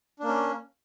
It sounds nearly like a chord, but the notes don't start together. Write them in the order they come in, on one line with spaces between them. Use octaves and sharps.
D4 A#3 C#4